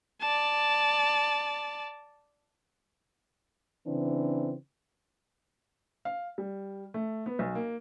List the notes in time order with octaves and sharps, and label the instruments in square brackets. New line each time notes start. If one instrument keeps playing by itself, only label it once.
[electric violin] D5 A5
[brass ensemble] C#3 E3 C4 D4
[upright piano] F5
G3
A3
B3
B1
A#3